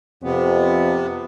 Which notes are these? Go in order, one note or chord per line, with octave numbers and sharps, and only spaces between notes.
F2 C3 B3 C4